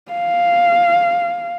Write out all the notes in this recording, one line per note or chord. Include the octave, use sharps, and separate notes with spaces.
F5